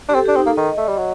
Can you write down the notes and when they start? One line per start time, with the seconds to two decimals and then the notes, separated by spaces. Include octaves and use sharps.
0.09 D4 G4
0.14 C4 A4
0.25 D4 G4
0.36 C4 D#4
0.46 A#3 A4
0.57 D#3 D#5
0.77 A3
0.88 G3
0.98 F#3